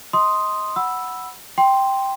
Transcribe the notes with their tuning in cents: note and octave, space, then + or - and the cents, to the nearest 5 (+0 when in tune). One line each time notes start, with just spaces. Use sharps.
D#5 +20 C6 +0 D#6 +0
F#5 +0 B5 -5 E6 +0
G5 +0 C6 +0